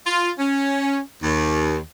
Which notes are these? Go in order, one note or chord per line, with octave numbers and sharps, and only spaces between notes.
F4
C#4
D#2